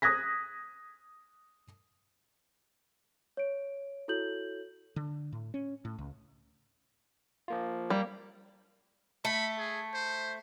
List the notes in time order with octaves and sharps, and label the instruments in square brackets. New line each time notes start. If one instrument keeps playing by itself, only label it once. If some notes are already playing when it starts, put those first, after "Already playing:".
[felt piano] D#6 F#6 G#6 A#6 B6
[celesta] C#5 D7
E4 F#4 A4 C#5 G6 F#7
[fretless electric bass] D3
A2
C#4
A2
C#2
[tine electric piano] F3 A#3 F4
[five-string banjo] G3 [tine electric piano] A#3
[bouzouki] A3 [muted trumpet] B5
[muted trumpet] G#4
C5